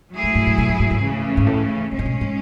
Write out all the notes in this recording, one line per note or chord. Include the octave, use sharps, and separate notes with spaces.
F#3 A3 E4 G#4
G#2
A2
A2
B2
A2
A2
G#2
C#3 E3 A3
G#2
A2
G#2 B2 G#3 C#4
A2
B2
A2